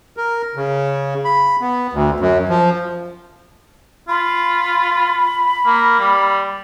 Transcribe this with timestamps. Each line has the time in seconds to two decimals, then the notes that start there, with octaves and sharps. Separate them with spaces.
0.17 A#4
0.55 C#3
1.25 B5
1.61 B3
1.93 D2
2.20 F#2
2.49 F3
4.08 F4 B5
5.66 A#3
6.00 G3